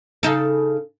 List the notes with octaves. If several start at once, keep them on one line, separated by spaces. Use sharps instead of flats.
C#3 D#4 A4